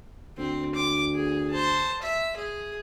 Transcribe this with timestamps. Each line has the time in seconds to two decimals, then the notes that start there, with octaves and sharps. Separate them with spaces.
0.38 D2 C4
0.75 D6
1.15 G#4
1.50 C5 A5
2.02 E5
2.36 G#4